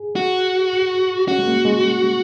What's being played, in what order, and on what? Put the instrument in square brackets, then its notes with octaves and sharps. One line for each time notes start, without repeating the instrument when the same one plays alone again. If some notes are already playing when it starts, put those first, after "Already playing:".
Already playing: [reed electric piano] G#4
[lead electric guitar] F#4
[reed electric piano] C#4 [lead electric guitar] F#4
[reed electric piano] G#3
A#3
G#3